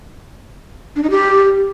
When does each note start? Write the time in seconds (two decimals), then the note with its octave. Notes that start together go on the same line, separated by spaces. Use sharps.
0.96 D4
1.03 D#4
1.10 G4